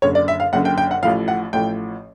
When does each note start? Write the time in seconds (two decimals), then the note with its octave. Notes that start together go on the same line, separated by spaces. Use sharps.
0.02 F#1 F#2 D3 C#5
0.15 D5
0.28 E5
0.40 F5
0.53 F#1 F#2 D3 F#5
0.65 G5
0.78 G5
0.91 F#5
1.03 A1 A2 F3 F5
1.28 F#5
1.53 A1 A2 F3 G5